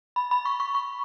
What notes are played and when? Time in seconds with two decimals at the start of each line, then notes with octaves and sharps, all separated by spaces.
0.16 B5
0.31 B5
0.45 C#6
0.60 C#6
0.75 C#6